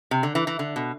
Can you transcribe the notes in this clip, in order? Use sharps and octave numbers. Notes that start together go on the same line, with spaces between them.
C3
D3
E3
E3
D3
B2